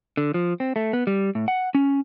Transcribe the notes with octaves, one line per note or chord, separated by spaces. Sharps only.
D3
F3
C4
A3
B3
G3
A2
F#5
C#4